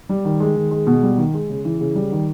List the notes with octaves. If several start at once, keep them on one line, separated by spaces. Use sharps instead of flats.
G3
D#3
G#3
D#3
G#3
B2
G3
D#3
G#3
C#3
E3
C#3
G3
D#3